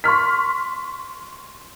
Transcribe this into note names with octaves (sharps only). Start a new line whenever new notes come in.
C6 C#6 F6 B6